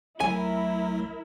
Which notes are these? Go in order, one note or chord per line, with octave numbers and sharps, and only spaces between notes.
B1 F#3 A3 E4 A#4 G#5